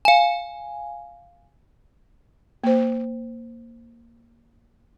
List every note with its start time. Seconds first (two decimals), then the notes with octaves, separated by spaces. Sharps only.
0.05 F5 G#5
2.64 A#3 C5